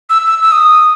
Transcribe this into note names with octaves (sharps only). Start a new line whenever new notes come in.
E6
E6
E6
D#6